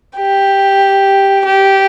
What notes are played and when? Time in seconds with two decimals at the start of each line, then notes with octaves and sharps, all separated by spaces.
0.16 G4
1.45 G4